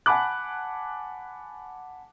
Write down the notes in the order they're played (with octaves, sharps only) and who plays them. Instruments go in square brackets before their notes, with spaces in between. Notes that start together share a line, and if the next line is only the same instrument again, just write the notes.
[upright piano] F#5 G#5 A5 B5 D6 F#6